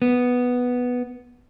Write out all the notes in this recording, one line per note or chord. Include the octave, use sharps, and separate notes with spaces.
B3